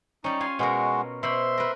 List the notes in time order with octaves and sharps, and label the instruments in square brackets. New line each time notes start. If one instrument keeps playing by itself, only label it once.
[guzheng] G3 C#4 [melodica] D#4
[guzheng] F4 F5 G#5
[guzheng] B2 C#4 A#4 [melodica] G#3 F#4
[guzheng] B2 C5 B5 [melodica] E5 C6
[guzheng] A#4 B4